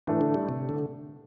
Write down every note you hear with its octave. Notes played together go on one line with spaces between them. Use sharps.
A2 E3 A3 D4
D3
G3
C3
D3